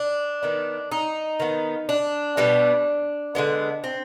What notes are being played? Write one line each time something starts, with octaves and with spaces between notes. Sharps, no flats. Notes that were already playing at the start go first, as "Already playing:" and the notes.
Already playing: D4
D#3 B3
D#4
D#3 B3
D4
B2 G3 B3
D3 G#3 B3
C4